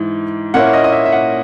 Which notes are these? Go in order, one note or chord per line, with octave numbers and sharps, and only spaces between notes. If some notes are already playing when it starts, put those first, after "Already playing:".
Already playing: G#2 E3
A#2 A#3 C#4 E4 F#5
D#5
D#5
E5
E5
F#5